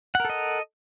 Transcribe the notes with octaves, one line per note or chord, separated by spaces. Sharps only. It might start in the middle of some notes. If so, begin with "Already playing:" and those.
A4 A#4 D#5 F#5